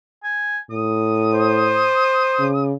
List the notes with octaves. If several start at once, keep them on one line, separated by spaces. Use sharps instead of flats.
G#5
A2 D#6
C5
C#3